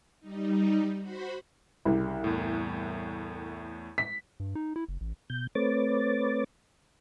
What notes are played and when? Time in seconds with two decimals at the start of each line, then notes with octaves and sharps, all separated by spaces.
0.20 G3 D#4
1.01 F#4 C5 B5
1.85 C2 C#3 G3
2.24 E2 A2
3.98 B6
4.40 G2
4.55 D#4
4.76 E4
4.88 F#1
5.01 A1
5.30 B2 G6
5.55 A3 C4 B4 C#5 D6 A6